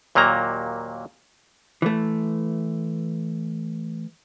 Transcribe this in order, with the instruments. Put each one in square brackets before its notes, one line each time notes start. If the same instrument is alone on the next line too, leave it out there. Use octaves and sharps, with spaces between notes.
[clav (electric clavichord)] D#2 A#2 F#3 A#3 A#5
[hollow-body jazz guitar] E3 A3